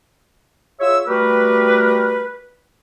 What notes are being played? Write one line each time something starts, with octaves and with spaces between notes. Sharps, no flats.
F4 G#4 C#5 E5 E6
G3 A3 F#4 G4 A#4 B4